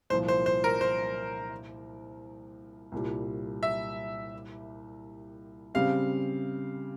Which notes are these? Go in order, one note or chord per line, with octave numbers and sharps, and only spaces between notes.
C2 A#2 F3 C5
C5
C5
A#4
C5
C2 A#2 G3
E5
C#3 G3 C4 G4 F5